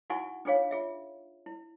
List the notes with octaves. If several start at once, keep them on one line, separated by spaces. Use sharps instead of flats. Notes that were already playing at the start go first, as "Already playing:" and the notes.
D#4 E4 F#4 F#5 G#5 C#6
D4 D#4 F4 G#4 C#5 F5
F4 G#4 E5
E4